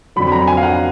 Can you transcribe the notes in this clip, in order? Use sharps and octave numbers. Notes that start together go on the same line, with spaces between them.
F2 D3 F#3 B5
B5
A#5
G#5
F5
F#5